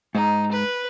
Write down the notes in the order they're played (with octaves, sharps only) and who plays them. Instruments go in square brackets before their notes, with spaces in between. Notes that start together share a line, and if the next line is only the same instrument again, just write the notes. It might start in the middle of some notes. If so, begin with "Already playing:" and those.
[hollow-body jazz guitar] G#2 [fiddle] D#4
[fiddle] B4